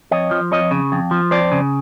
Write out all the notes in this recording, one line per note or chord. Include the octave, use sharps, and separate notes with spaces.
F2 C#5 D#5
F3
F2 C#5 D#5
C#3
F2
F3
F2 C5 D5
C#3